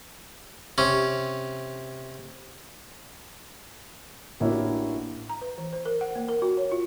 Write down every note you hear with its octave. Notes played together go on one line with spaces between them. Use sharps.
C3 C#4
A1 A#3 D4 E4 F#4 C#5
A#5
B4
E3
C5
A#4
F#5
A#3
A#4
F#4
C#5
F4